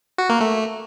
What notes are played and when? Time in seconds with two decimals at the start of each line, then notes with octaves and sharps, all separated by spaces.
0.18 F#4
0.30 A#3
0.41 A3